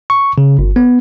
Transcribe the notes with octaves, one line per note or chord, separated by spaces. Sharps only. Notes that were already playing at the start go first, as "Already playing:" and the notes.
C#6
C#3
G1
B3